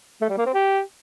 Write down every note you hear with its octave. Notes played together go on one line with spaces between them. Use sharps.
A3
G3
A#3
C4
G4